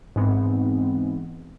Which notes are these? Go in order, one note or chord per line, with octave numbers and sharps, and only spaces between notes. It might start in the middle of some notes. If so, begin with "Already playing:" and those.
G#2 E3 G#3 B3 C4